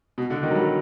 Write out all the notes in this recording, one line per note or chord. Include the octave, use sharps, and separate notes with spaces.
B2
D3
D#3
F#3
G3